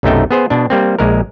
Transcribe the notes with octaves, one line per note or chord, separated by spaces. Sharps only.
B1 F#2 C3 A3 D#4 G5
B3 G#4 C5
B2 D4
G3 A#3 C4
A#1 G#3 A#4